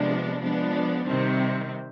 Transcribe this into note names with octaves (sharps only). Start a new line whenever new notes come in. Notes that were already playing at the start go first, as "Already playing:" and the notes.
Already playing: C3 F3 G#3 B3 D4
F3 G#3 B3 D4
C3 D#3 G3 C4